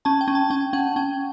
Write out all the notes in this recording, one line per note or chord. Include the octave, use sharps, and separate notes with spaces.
C#4 A5
G5
C#4
A5
C#4 G5
C#4 F#5
C#4 G5